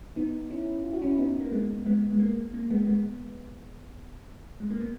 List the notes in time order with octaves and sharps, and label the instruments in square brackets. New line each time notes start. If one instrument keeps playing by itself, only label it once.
[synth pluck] B3 D#4
C#4 E4
E4
F#4
C#4 E4
B3 D#4
A#3
G#3 B3
G#3 B3
G#3
A#3
A#3
G#3 B3
G#3 B3
G#3
A#3
B3